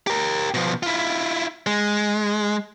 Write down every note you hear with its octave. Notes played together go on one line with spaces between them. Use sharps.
G4 A#4
B2 F3
E4 F4
G#3